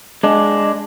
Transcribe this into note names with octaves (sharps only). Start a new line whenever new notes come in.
G#3 D4